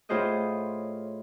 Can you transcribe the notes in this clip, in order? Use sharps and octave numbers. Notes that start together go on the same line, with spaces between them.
A2 F4 G#4 C5 C#5 D#5